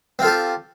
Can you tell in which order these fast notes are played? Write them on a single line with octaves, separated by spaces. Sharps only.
C4 F4 A4 G4